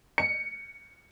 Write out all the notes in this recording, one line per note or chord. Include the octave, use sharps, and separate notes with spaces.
C#7